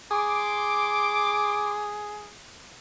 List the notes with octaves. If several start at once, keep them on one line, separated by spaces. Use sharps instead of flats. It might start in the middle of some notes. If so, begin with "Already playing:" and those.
G#4 C6 D6